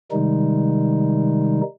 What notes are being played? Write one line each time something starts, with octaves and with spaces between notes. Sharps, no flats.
C3 D#3 G3 G#3 D#4